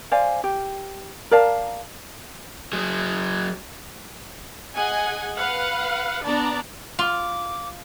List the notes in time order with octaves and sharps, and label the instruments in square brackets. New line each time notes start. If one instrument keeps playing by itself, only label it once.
[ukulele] C5 D5 F5 G#5
G4
A#4 D5 F5 A5
[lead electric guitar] F#3 G#4
[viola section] G#4 D#5 F#5 G#5
B4 F5 F#5
B3 D4 D5 A5 A#5
[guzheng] F4 [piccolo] D6